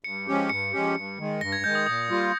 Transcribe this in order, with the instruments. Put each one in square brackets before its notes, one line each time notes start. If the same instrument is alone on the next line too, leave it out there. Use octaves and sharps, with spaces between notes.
[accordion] G2 [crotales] C#7
[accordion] F3 G#3 C#4 G4
[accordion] G2 [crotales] C#7
[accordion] F3 G#3 C#4 G4
G2
D#3 G#3
[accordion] G2 [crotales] A#6
[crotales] G#6
[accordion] D#3 G#3 [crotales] G6
[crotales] D#6
[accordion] A#2 [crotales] D#6
[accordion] G3 A#3 F4